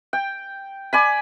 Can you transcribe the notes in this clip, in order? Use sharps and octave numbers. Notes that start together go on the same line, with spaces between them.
G5
D5 G#5 B5